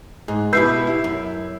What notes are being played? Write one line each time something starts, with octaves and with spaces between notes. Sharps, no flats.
G#2 G#4
B2 E4 G4 B4 E6 G6 C7
E4
F#2